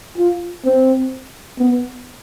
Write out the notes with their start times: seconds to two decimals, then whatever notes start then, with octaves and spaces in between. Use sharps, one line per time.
0.18 F4
0.64 C4
1.59 B3